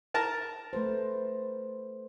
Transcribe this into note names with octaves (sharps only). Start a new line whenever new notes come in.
A#4 A5 A#5
A3 B4 C5